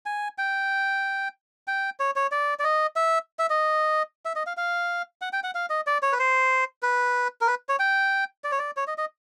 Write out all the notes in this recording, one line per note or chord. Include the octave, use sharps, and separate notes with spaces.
G#5
G5
G5
C#5
C#5
D5
D5
D#5
E5
E5
D#5
E5
D#5
F5
F5
F#5
G5
F#5
F5
D#5
D5
C#5
B4
C5
B4
A#4
B4
C#5
G5
D5
C#5
D5
C#5
D#5
D#5